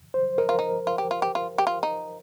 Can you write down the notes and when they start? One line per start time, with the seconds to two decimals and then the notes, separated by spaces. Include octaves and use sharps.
0.14 C5
0.38 D#4 A#4
0.49 F4
0.59 D#4
0.87 F4
0.98 G4
1.11 F4
1.22 G4
1.35 F4
1.58 G4
1.67 F4
1.83 D#4